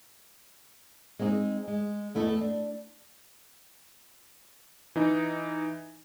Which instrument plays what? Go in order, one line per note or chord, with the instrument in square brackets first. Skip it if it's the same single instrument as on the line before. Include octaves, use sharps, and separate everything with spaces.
[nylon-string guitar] G#3 C4 D#4 F#4 G#4
G#3
E2 A3 E4 A4 D#5
D4
[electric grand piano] E3 D#4